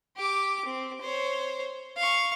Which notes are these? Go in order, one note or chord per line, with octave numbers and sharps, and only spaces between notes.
G4 D6
C4
C5 C#5
F5 C#6